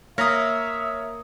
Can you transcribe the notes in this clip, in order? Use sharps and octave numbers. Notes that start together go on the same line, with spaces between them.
A#3 C#5 E5 A#5 D#6 F6 A#6 B6